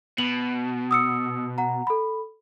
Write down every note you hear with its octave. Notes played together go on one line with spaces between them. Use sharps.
B2 F#7
D#6 E6 C#7
F#5 A#5
A4 B5